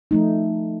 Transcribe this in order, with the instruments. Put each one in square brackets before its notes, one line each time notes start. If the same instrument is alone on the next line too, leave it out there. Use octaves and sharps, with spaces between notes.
[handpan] F3 A3 D#4